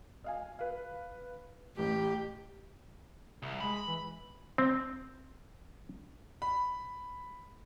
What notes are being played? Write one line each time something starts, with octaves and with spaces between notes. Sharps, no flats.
D#5 F5 G#5
B4 F5
A1 A2 G4
C2
G#3 B5
E3
C4
B5